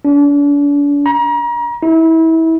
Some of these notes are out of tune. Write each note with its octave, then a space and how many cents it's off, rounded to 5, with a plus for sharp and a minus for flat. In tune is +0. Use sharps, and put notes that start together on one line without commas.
D4 -40
A#5 +35
E4 -30